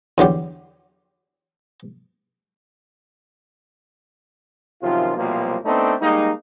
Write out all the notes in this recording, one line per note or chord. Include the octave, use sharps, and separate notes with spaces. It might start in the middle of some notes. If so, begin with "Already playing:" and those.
E2 D3 F#3 G4
F#2 C3 D#3 F3 F4
C2 B2 F3 F#3 A#3
A3 B3 C4 D4 D#4 A4
G3 G#3 A#3 D#4